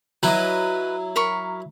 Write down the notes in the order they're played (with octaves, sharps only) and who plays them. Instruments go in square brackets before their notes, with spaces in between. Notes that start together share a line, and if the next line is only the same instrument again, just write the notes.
[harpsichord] F#3 E4 [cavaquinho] B4 D#5
[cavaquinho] A#4 B5 C#6